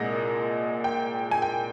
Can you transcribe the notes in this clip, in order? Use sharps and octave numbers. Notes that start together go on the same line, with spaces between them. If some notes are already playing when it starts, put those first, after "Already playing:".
Already playing: C2 A#2 G#3 D#5
G5
G#5
G5